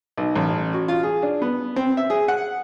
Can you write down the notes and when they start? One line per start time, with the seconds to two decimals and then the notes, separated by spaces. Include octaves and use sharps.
0.18 B1
0.35 A1
0.74 F#4
0.88 F4
1.03 G#4
1.23 D4
1.42 B3
1.76 C4
1.97 E5
2.10 G#4
2.28 F#5